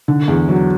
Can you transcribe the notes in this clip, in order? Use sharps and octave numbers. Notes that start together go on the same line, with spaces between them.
D3
E2
F#3